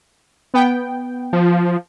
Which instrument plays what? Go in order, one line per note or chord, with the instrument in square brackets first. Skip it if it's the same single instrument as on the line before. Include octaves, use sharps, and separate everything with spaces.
[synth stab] B3 G5
[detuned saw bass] F3